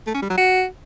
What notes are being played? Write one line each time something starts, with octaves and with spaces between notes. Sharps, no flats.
A3
C#4
G3
F#3
F#4